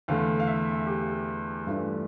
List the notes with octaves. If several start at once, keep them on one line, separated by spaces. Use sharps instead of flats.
E2 D3 A3 F5
F5
E5
G4
G2 E3 A3 D4 F4